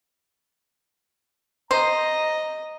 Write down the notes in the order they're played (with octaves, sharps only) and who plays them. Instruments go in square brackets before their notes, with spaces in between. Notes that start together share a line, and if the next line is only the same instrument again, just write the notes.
[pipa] C5 [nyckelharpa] D#5 [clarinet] A#5